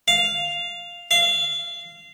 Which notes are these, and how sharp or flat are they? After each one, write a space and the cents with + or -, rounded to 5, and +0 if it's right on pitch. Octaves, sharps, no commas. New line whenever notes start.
F5 +0
F5 -20